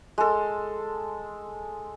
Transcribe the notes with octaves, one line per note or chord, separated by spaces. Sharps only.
G#3 A4